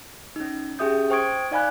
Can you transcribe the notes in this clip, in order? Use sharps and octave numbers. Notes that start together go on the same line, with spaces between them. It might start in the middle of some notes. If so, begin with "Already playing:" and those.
C#4 D#4
C#4 G4 G#4 E5 D#6 G6
C5 G5 C#6 D#6 G#6 D7
D#4 D5 F5 G#5 B5 F#6